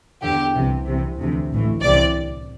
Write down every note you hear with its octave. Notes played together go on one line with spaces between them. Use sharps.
E2 D3 G4
C2 C3 E3
C2 C3 E3
D2 C3 E3
A1 A2 E3
C2 C3 E3 D5